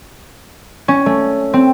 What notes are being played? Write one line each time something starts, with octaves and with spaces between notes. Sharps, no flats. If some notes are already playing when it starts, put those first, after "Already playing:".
C#4
A3
C4